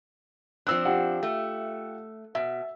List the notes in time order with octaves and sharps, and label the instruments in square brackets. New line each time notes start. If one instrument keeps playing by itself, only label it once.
[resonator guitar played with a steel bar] F3 C4 D4 [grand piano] E6 F#6
[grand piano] F4 G4 F#5
[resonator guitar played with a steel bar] A3
[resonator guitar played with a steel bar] B2 [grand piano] E5